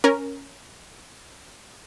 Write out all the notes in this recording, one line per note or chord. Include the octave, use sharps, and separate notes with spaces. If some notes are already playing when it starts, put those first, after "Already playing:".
C#4 A#4